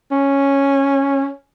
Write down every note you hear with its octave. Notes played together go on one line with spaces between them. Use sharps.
C#4